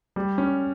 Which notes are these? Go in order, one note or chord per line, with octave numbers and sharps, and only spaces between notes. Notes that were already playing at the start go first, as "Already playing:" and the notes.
G3
C#4